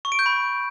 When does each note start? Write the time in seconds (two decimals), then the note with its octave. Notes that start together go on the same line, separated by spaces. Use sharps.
0.05 C#6
0.12 D7
0.19 G6
0.26 B5